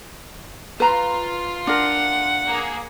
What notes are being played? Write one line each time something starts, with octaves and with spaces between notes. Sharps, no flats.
F4 B4 A#5
D4 A#4 F#5
A#3 G#4